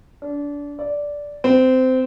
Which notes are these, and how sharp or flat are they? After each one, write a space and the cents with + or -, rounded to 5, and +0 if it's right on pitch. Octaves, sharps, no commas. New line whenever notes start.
D4 -25
D5 -10
C4 -20